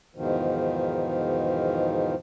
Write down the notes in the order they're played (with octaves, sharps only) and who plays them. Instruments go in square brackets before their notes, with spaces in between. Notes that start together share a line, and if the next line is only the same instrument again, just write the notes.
[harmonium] E2 G#2 B2 D#3 F3